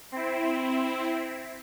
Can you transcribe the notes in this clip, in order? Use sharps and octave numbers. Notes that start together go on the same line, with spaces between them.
C4 E4